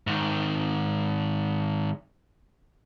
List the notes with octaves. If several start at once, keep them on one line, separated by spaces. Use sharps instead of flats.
G#2 D#3